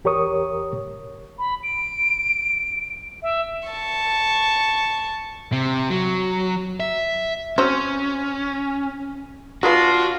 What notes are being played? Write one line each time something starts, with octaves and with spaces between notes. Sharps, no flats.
E2 G4 A#4 C#5 C#6 D#6
B5
D7
E5
A5 C#6
C3
F#3
E5
C4 C#4 F#4 C5
G#3 D4 F4 F#4 B4